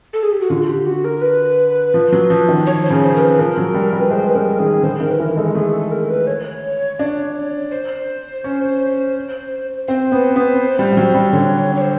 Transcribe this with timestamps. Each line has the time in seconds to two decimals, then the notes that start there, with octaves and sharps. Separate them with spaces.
0.13 A4
0.23 G#4
0.32 G4
0.41 F#4
0.50 D3 F4
0.68 G4
0.86 F#4
1.05 A#4
1.22 B4
1.94 F3
2.12 F#3
2.30 F3
2.48 D#3
2.67 C#5
2.85 C5
2.90 C#3
3.03 C5
3.16 A#4
3.20 B4
3.39 F3 A#4
3.57 F#3
3.74 G3
3.93 G3
4.00 B4
4.11 G#3 C5
4.27 B4
4.35 G3 A#4
4.59 D#3 G#4
4.83 D3 C5
5.01 D#3 A#4
5.11 B4
5.19 E3 A#4
5.37 G#3 A4
5.55 A3 G#4
5.73 A4
5.91 A#4
6.10 B4
6.27 C#5
6.99 D4
7.71 C5
8.44 C#4
9.88 C4 C5
10.12 B3
10.36 B3
10.79 G3
10.93 G3
10.97 F#3
11.15 G3
11.33 D3 C#5
11.57 C#5
11.76 C#5
11.81 C5